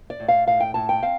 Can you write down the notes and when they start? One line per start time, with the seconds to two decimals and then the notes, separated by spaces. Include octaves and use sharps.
0.10 D5
0.20 A2
0.28 F5
0.47 A2 F5
0.60 G5
0.74 A2 A5
0.89 G5
1.02 C4 F5